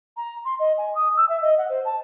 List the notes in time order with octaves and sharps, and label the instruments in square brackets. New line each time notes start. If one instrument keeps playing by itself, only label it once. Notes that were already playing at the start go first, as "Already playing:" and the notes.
[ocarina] A#5
C6
D#5
G#5
D#6
E6
E5
D#5
F#5
C5
A5